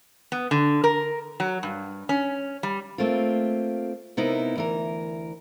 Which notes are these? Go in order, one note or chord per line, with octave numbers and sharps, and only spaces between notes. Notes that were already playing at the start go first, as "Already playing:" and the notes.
B3
D3
A#4
F#3
G2
C#4
G3
A3 A#3 C4 F4
C3 B3 D#4 E4 A#4
D2 E3 A#4